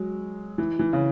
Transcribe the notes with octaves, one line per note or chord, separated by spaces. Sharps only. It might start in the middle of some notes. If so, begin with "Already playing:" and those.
Already playing: F#3 G#3
E3
E3
C#3